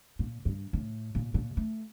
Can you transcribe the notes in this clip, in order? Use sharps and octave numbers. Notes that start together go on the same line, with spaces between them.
A#2
G2
A2
A#2
A#2
A3